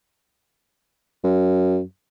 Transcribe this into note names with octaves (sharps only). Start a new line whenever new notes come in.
F#2